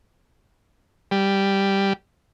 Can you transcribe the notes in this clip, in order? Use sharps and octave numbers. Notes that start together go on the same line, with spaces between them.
G3